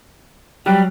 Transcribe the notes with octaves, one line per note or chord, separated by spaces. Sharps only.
F#3 G3 G5 F#6 D7